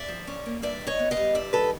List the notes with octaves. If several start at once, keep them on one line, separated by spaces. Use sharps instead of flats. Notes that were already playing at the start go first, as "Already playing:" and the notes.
Already playing: D5 E5
F3
C#4
A#3
G2 D5 E5
D#3
C#5 D#5
B3
D#5 F5
G3
G2 D5 E5
D#3 A4 B4